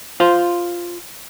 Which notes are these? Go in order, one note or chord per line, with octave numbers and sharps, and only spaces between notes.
F4 C5